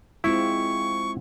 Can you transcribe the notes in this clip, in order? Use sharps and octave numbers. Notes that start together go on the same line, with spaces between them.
G#3 C4 E4 F4 C#6